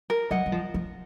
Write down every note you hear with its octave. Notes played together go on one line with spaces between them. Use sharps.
A#4
F#3 D#5 F#5
F#3
F3
F3